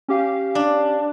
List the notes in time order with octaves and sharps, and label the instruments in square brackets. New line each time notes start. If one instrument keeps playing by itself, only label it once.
[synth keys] C#4 G4 F5
[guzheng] D4